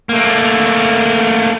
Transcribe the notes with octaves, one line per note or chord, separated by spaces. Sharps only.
A3 A#3